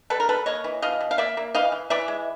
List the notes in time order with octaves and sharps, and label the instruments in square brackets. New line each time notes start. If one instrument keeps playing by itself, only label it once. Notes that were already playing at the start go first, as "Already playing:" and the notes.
[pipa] G3 A4 B4
A#4
G3 A4 B4
A#3 C#5 D#5
E3
B2 D#5 F5
B2
F5
A#3 D5 E5
A#3
E3 D#5 F5
E3
E3 D5 E5
G#3